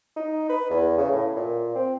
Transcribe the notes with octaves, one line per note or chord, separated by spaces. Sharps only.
D#4
B4
E2
C#3
A2
A#2
C4